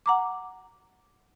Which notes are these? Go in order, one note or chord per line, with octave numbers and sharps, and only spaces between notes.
F#5 A#5 D6